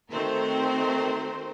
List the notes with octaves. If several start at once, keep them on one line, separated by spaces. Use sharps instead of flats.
D#3 A3 C4 F#4 A#4 C5